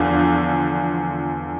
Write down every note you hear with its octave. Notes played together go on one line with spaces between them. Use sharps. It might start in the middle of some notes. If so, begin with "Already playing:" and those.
Already playing: E2 D3 F3